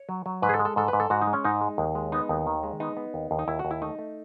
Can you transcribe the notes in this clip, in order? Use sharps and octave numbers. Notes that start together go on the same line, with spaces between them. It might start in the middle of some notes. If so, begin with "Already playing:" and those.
Already playing: C#5
F#3
F#3
G#2 B4
G#4
A4
G#3
A4
G#2 A4
B4
G#2
A4
G#2 F#4
D#4
G#3
C#4
G#2 D#4
G#3
D#2
G#3
B3 D#4
D#2
D#3
G#3
B3 D#4
B3
D#2
D#2
D#4
D#2 E4
F#4
D#2
E4
A3 D#4
A3